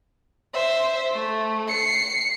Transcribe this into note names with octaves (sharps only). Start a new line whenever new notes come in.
C5 E5
A3
C7 C#7